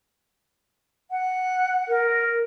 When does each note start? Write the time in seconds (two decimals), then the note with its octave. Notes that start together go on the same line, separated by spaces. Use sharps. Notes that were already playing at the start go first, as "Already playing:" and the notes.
1.11 F#5
1.88 A#4